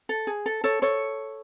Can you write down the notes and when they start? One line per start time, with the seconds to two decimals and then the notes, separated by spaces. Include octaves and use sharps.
0.09 A4
0.27 G#4
0.46 A4
0.64 A4 C#5
0.82 A4 C#5